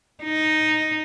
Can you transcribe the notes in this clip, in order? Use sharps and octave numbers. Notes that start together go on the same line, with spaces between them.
D#4